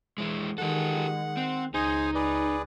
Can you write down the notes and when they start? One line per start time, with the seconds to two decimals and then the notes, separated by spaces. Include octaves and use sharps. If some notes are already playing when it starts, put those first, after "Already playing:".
0.18 E3 G#3 E4
0.58 D#3 G#3 G4 A4 F#5
1.37 C4
1.74 C#2 D#4 G#4 C5 G#5
2.15 G#4 B4 D5